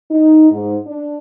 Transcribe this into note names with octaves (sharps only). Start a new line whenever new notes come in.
D#4
G#2
D4